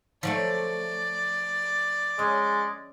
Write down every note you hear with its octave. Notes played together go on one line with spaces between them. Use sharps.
F3 F#3 A3 D5
G#3 C#4